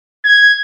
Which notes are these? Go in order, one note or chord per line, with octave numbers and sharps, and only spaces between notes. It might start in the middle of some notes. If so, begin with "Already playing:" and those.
G#6